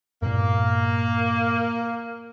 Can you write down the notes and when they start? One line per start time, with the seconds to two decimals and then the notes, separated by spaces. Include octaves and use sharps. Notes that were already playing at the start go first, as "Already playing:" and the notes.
0.22 G2 A#2 A#3